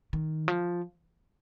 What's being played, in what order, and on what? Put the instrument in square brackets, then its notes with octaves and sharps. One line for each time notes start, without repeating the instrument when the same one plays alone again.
[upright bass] D#3
F3